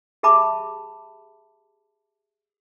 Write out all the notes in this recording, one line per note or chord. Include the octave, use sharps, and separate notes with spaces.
G4 G#4 E5 A5 B5 D6